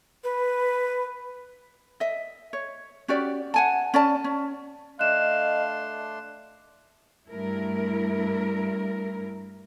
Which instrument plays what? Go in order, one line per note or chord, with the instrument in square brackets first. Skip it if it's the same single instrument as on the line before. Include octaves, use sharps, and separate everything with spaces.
[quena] B4
[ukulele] D#5 E5
C#5
C#4 F#4 G4 D5
F#5 G#5 A5
C#4 D5 A5
C#4
[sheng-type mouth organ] A3 D4 C6 [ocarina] D#5 [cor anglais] F5 [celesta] F#6 E7
[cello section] G2 A3 E4 A#4